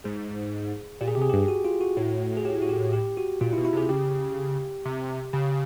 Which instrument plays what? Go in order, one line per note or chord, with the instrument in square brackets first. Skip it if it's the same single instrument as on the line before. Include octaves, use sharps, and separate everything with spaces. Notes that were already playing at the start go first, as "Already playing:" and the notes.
[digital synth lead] G#2 [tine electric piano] G#4
[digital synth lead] A#2 [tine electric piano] G4
[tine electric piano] G#4
[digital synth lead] C3 [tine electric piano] G4
[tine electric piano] G#4
[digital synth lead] G2 [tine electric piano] G4
[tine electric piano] F#4
F4
F#4
[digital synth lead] A2
[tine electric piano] G#4
G4
F#4
G4
G4
F#4
[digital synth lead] A#2 [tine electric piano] F4
[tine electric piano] E4
[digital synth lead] B2
[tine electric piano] E4
[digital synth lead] C3 [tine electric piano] G#4
[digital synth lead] C#3 [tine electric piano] G4
[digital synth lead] C3
[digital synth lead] C#3 [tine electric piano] G4